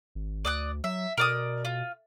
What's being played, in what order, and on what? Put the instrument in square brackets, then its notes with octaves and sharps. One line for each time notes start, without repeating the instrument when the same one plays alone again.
[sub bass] G#1
[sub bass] D2 [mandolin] D5 D#6 F#6
[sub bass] F#3 [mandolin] E5
[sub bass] B2 [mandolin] A#4 D5 D#6
[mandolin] F4